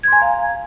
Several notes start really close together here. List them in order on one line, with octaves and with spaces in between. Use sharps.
G#6 C6 G#5 A#5 F5